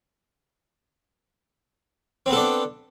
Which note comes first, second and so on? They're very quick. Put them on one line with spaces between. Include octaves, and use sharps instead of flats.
C4 B3 A4 D4